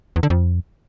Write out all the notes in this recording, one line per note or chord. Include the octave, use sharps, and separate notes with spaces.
E2
D3
F2